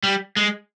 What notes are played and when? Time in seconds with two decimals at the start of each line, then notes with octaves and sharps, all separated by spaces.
0.03 G3
0.36 G#3